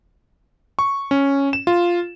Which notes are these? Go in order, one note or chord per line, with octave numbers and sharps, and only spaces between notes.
C#6
C#4
E7
F4